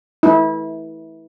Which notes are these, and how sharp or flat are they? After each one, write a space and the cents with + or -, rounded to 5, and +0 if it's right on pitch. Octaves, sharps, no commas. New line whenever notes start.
E4 -25